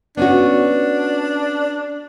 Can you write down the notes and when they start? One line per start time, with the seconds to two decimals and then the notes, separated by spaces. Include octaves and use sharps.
0.17 B3 C#4 D4 F#4